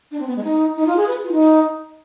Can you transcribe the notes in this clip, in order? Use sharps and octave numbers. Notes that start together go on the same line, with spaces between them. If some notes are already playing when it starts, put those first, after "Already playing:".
D4
C4
B3
G#3
D#4
D#4
F4
G#4
B4
F4
D#4